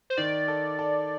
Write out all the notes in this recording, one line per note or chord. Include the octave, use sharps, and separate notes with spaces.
C5
D#3 D5
A4
A4